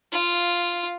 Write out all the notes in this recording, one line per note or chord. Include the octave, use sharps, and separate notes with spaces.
F4